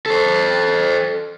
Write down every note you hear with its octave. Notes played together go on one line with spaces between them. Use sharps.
A4 C5